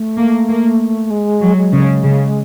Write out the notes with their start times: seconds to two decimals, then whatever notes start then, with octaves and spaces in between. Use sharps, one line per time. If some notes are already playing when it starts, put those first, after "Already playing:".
Already playing: A3
0.17 A#3
0.48 A#3
1.10 G#3
1.41 F#3
1.57 G#3
1.73 C#3
2.04 C#3